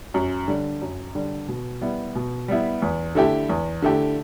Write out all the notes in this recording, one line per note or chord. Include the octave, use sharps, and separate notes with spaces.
F#2
D3 G3
F#2
D3 G3
B2
G3 B3 E4
B2
G3 B3 E4
E2
D3 A3 E4 G4
E2
D3 A3 E4 G4